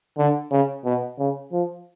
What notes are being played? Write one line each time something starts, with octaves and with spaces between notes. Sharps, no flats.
D3
C#3
B2
C#3
F3